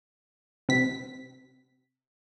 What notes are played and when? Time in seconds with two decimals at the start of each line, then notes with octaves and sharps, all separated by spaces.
0.69 C3 B6